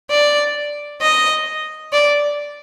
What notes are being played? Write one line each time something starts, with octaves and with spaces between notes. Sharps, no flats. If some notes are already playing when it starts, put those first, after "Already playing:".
D5
D#5
D5